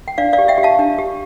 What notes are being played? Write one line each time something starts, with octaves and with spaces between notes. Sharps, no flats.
G5
D4 D5 F5
D5 F5
G4
E5 G5
G4
F5 A5
D4
G4